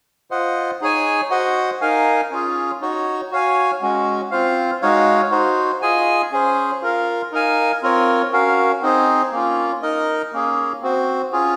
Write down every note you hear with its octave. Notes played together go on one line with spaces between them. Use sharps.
F4 C5 D#5 F#5
D#4 G#4 C#5 G#5
F#4 C5 D#5 F#5
D#4 A#4 F5 G#5
C#4 F4 G#4
D#4 F#4 C#5
F#4 C#5 F5 G#5
G#3 C#4 F#4
C4 F4 C5 F5
G#3 D#4 F#4 C#5 F5
D#4 F#4 C5
F4 G#4 D#5 G#5
C#4 G#4 C5
F4 A#4 F5
D#4 A#4 F5 G#5
C4 F4 A#4 C#5
C#4 F#4 A#4 F5
C4 D#4 G#4 C5
A#3 C#4 F4
D#4 A#4 D#5
A#3 C#4 G#4
C4 F#4 C5
C#4 F4 G#4